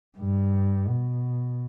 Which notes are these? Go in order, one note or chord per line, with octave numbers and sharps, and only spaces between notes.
G2
B2